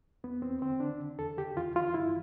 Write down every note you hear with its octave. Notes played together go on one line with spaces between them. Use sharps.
E2 B3
E2 C4
D3 C4
D3 D4
D3
E2 A4
D3 G4
E2 F4
E3 F4
G2 E4